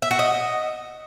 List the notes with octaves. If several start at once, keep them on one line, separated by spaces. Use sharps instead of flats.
E5
F#4
D#5